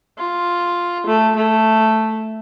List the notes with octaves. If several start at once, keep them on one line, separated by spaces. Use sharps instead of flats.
F4
A3
A3